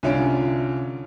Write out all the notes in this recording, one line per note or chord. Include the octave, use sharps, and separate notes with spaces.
C2 D3 C#4 F4 D7